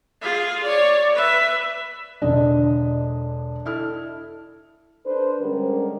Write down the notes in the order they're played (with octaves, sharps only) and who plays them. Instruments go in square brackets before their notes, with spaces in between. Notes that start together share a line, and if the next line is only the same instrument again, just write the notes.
[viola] F4 G#4
C#5 D5
B4 E5
[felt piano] E1 D3 D#5 [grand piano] D4
[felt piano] E4 A4 F6
[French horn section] D4 A4 B4 C5
D3 G3 G#3 C#4 A#4